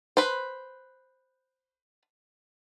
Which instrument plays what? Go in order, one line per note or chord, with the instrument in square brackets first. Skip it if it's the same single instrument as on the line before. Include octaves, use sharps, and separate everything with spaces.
[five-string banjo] B4 C5